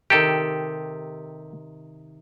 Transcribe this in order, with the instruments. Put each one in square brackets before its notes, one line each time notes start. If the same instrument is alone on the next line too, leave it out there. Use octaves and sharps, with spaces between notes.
[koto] C3 D#3 [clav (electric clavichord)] G4 A4